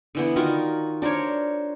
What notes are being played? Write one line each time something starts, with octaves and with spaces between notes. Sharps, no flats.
D3 E3 B3
D#3 F4 F#4 A#4
D4 A#4 C5 C#5